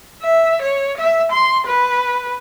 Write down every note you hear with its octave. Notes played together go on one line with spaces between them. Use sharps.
E5
C#5
E5
C6
B4